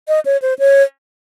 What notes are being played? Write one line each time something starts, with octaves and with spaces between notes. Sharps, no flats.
D#5
C#5
C5
C#5